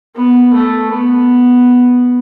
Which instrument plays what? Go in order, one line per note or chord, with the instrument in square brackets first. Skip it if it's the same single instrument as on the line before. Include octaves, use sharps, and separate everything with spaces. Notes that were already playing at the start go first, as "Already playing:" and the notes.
[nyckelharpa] B3
A3
B3